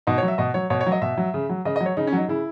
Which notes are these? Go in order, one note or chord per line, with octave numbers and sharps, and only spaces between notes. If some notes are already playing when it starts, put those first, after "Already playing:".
B2 D#4
C#5
F#3
E5
B2 D#5
F#3 C#5
B2 C#5
C#5
F#3
D#5
B2 E5
F#3
C#3
F#3
C#3 D#5
D#5
F#3
C#5
C#3 D#4
C#4
F#3 D#4
C#3 E4